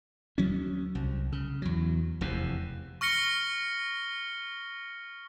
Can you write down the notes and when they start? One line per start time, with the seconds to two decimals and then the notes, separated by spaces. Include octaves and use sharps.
0.38 D2 F#3 C#4
0.95 C2
1.32 C#3
1.62 E2 F#3
2.21 F1 E2 C3
3.01 C#6 F6 A#6 C#7 G7